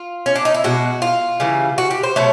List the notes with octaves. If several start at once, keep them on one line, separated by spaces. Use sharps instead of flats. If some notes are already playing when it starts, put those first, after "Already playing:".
Already playing: F4
C#4
D4
D#4
E4
B2 G#3 F#4
F4
C#3 E3 G3
F#4
G4
C5
B2 F#3 A3 C#5